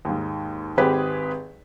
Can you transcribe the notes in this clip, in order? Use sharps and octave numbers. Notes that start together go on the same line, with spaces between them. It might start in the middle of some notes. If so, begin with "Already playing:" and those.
D#2 G#2
G#1 C4 G4 G#4 B4